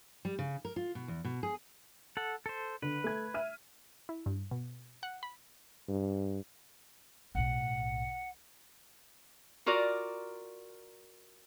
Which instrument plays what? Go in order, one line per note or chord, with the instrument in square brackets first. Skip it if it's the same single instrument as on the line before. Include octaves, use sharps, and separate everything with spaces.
[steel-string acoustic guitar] G3
C#3
A#4
F4
B2
E2
B2
G#4
[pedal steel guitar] A4 F#5
A4 C5
[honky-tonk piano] D3 [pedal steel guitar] B4
[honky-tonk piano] A3 G#6
E5 F6 D#7
[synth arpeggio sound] E4
G2
B2
F#5
B5
[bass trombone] G2
[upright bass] B1 A2 [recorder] F#5
[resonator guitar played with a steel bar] F4 F#4 A#4 D5